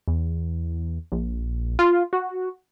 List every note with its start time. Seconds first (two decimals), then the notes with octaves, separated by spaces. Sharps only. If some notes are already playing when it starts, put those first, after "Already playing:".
0.08 E2
1.12 A#1
1.79 F4
2.13 F#4